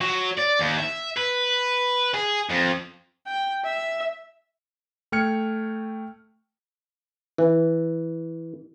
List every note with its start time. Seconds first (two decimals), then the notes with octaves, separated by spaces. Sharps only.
0.01 F#3
0.37 D5
0.59 D#2
0.79 E5
1.17 B4
2.14 G#4
2.50 F2
3.27 G5
3.65 E5
5.12 A3 G5 F6 G#6 C#7
7.38 E3